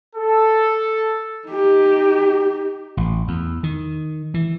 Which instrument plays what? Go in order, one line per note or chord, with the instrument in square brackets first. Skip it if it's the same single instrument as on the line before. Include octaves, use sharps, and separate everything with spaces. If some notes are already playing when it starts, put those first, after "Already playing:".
[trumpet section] A4
[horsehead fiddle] D#4 G4
[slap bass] A1
E2
D#3
E3